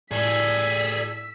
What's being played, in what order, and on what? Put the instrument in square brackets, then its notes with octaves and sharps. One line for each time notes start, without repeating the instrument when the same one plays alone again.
[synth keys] A2 [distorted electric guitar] G#4 A4 [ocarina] D5 [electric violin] E6 B6